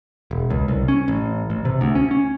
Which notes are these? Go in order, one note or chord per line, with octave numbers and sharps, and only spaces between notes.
E1
C#2
C2
C#4
A1
A1
C3
D2
C#4
C#4